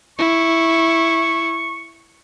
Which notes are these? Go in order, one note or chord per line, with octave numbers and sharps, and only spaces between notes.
E4 C#6